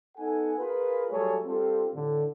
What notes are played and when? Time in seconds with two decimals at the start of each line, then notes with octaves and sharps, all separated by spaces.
0.17 B3 D#4 A4 F#5 G#5
0.58 F4 G#4 A#4 B4
1.11 F#3 G3 A3 G#4 A4 C#5
1.45 G3 C4 D4 F4 G4 A4
1.94 A2 D3